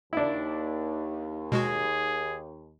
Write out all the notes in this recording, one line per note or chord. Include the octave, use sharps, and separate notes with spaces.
D#2 D4 E4
B2 G#3 F#4 G#4